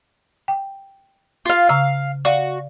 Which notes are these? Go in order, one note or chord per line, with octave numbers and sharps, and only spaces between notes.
G5
F4 F5
C#3 F5 A#5 E6
F#4 D5 F5